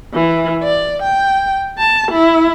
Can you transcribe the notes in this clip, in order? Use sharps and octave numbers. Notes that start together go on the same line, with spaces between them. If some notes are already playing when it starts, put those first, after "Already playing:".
E3
D5
G5
A5
E4